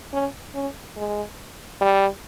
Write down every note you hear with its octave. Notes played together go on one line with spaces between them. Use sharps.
C#4
C#4
G#3
G3